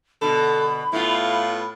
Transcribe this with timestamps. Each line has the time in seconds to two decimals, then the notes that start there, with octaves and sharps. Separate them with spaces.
0.22 B2 D3 A4 B5
0.93 A2 B3 E4 F4